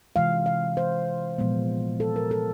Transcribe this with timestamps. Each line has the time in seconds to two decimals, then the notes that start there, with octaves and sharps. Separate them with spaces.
0.16 C3 E3 G#3 F5
0.46 F5
0.77 C5
1.38 A#2 F3 G#3 B3
2.00 A4
2.16 A#4
2.31 A4